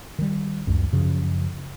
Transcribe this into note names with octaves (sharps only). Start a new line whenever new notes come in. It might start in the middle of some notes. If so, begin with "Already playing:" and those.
D#3 G3
C#2 F#2
F#2 C#3 F3